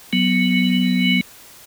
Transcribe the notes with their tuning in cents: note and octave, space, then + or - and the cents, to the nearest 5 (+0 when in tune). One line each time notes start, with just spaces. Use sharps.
F#3 +0 B3 +0